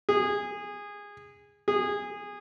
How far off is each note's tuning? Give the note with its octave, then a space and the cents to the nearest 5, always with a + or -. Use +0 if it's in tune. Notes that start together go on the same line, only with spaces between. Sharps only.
G#4 -20
G#4 -20